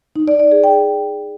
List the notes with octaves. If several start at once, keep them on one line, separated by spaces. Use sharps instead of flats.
D#4
D5
D5
G#4
G5